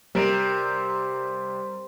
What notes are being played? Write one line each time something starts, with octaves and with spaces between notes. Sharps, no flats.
C3 G3 A#4 D7